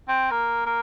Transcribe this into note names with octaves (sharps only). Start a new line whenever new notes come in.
C4
A#3
A#3